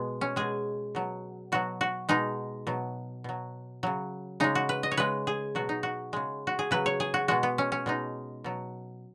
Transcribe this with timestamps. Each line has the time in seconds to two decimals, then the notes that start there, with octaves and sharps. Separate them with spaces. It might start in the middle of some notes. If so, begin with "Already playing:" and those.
Already playing: B2 G#3 B3
0.21 C#4
0.36 B2 G#3 G#4
0.95 B2 F#3
1.52 B2 F#3 F#4
1.81 F#4
2.09 B2 G#3 D#4
2.67 B2 F#3
3.24 B2 F#3
3.83 C#3 F#3
4.40 C#3 G#3 D#4
4.55 F#4
4.69 B4
4.83 D#5
4.91 C#5
4.97 C#3 G#3 B4
5.27 G#4
5.55 B2 F#3 F#4
5.69 D#4
5.83 F#4
6.13 C#3 G#3
6.47 F#4
6.59 G#4
6.71 C#3 F#3 B4
6.86 C#5
7.00 G#4
7.14 F#4
7.28 B2 G#3 F#4
7.43 B3
7.58 C#4
7.72 C#4
7.86 B2 G#3 D#4
8.44 B2 F#3